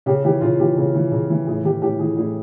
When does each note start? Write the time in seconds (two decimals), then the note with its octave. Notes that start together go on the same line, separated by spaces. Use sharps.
0.06 C#3 G4
0.24 E3 G4
0.41 C#3 F4
0.59 E3 G4
0.77 C#3
0.95 E3
1.12 C#3
1.30 E3
1.47 A2 G#4
1.64 E3 G4
1.82 A2 G4
1.99 E3 G#4
2.17 A2 G#4